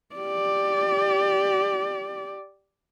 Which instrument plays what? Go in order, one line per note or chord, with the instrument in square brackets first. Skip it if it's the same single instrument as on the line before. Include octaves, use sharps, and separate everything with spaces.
[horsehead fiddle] G4 D5